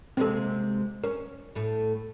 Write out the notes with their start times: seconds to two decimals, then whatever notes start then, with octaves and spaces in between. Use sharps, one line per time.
0.17 C3 G#3 A#3 C4 A4
1.04 C#4 A#4
1.55 A2 A3